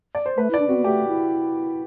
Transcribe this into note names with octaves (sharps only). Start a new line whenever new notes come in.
D5
C5
A3 B4
E4 D5
D4
C4 F#4
B3
A3 G4
E4